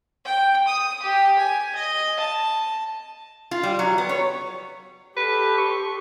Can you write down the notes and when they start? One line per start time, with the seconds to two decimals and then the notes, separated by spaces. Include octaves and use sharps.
0.25 G5
0.67 D#6
1.03 G4
1.39 G#5
1.75 D#5
2.20 A5
3.51 F4
3.63 G3
3.79 F#3
3.98 B3
4.09 C#5
5.17 G4 A4 B4
5.58 C#6